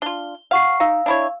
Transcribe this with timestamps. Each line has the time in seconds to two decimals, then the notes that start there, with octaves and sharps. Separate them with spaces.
0.02 D4 F4 G7
0.51 F5 F#5 C#6 C7
0.80 D#4 F5 E6
1.06 D4 E4 C#5